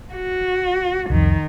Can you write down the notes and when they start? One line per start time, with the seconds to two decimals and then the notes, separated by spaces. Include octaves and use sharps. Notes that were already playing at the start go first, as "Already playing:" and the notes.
0.14 F#4
1.10 C2 F2 D#3